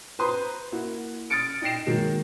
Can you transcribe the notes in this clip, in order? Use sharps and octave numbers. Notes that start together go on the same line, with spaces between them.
B4 C5 A#5 C6 D#6
A#3 E4 F#4
D#6 F6 A6 C#7 D7
D#4 D#5 G5 A#6 C7 E7
D#3 F#3 G#3 A#3